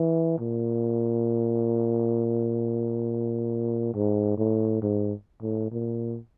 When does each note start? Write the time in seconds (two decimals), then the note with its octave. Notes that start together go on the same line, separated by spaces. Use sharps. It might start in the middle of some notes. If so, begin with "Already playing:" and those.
Already playing: E3
0.39 A#2
3.94 G#2
4.38 A2
4.82 G#2
5.42 A2
5.71 A#2